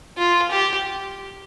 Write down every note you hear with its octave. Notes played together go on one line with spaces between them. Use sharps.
F4
G4